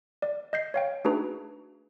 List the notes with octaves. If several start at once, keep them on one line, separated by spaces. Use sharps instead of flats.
D5
D#5 G6 C7
C#5 F5 G5
A3 D4 D#4 F#4 G#4 B4